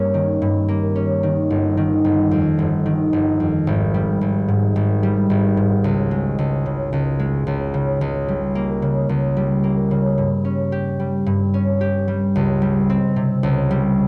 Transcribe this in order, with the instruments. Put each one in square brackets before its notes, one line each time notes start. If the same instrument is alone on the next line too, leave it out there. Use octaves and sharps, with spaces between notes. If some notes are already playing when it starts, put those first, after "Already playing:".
Already playing: [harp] G2 A#3 C#4
D#3
G2
A#3
C#4
D#3
G1
D#3
G1
F2
G1
D#3
G1
F2
G#1
G3
G#1
G#2
G#1
G3
G#1
G#2
C#2
G#3
C#2
C#3
C#2
G#3
C#2
C#3
C#2
G3
A#3
C#3
C#2
G3
A#3
C#3
G2
C#4
G4
G3
G2
C#4
G4
G3
C#2
G3
C4
C3
C#2
G3